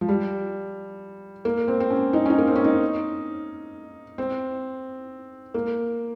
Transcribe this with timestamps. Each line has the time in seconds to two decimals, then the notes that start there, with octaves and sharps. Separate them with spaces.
0.01 F3
0.08 G3
1.45 A#3
1.68 C4
1.80 C4
1.90 C#4
2.13 D#4
2.25 C#4
2.30 D#4
2.38 A#3
2.47 C4
2.56 C#4
2.64 D#4
4.18 C4
5.54 A#3